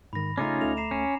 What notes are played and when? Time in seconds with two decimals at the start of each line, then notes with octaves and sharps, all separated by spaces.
0.13 G#2 D#3 B5 A#6
0.38 C#3 A3 C#4 D#4 F4 A#5 D6
0.61 D2 A3 F7
0.77 A#5 C7 E7
0.91 C#4